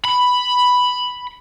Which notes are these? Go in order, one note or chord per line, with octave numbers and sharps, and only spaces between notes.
B5